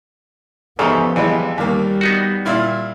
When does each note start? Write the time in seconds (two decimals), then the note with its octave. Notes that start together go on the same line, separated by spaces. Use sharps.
0.79 E2 G#2 C#3 F3 B3 G4 A4 E5
1.16 F2 E3 G3 G#3
1.58 D#2 G3 A#3
2.01 B3 D#4 F#4
2.45 A#2 E4 F4